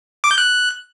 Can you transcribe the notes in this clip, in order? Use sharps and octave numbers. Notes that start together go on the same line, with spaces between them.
D6
G6
F#6